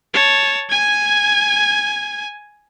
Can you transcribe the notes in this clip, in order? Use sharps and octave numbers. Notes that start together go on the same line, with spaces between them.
C#5 A5
G#5 G#6